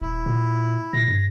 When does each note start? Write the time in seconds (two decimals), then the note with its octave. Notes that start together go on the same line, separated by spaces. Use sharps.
0.01 D#1 E4
0.26 A#2
0.93 A#2 A#6
1.08 G2